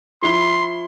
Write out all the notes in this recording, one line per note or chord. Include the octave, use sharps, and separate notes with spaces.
F3 E4 C6 G7